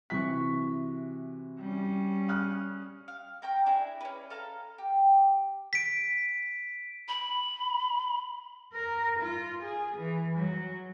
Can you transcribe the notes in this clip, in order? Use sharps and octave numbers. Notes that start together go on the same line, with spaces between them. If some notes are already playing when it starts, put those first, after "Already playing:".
C3 E3 F#4 C#6 B6
G3 C#4
D#6 F6 F#6
F5
A#4 G5 A#5 C#6
D4 E4 G#4
C#4 B4
A4 F5 A#5
G4
B6 D7
B5
A#4
F4
G#4
E3
F#3